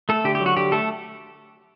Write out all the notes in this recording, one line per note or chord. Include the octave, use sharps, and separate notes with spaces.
A3 A4
D3 G4
G4
F#3
F#4
D3 G4
A3 A4